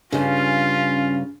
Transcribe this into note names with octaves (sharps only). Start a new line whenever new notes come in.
G2 C#3 C#4 F4